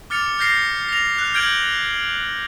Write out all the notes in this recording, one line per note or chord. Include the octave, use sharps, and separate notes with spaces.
D6 F6 A6 C#7 F7
F6 G6 A#6 C7 C#7
A#6 F7
F#6
F6 G6 G#6 D7 F#7